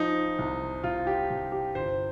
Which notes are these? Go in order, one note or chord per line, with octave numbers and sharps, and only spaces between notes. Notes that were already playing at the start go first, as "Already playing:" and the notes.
Already playing: F3 D#4
C2
C2 F4
G4
C2
G4
G1 C5